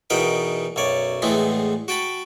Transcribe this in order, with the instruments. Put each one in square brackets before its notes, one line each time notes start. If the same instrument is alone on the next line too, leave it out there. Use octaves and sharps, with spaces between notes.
[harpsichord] E2 B2 D#4 A#4 B4 G5
B1 F#2 C#5 D5
E2 A2 G#3 A3 B3 C4
F#4 G5 A5 B5